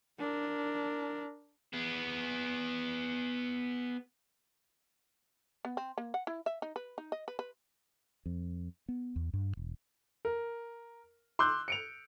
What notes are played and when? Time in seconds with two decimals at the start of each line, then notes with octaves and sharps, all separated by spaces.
0.19 D4 A#4
1.73 B3 G#4
5.65 B3
5.77 C4
5.98 A#3
6.14 F#5
6.27 E4
6.46 E5
6.62 D#4
6.76 B4
6.98 D#4
7.12 D#5
7.28 B4
7.39 B4
8.26 F2
8.89 B3
9.16 E2
9.33 G2
9.57 E1
10.25 A#4
11.39 C6 D6 E6 F#6 G6
11.68 C#7 D7 F7